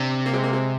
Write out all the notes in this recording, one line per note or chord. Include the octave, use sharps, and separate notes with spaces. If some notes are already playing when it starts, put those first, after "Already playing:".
Already playing: C3 D4
A#3
G#3 C4
A#3
G#3 C4